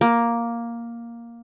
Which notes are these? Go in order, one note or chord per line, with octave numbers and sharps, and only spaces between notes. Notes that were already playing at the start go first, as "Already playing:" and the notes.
A#3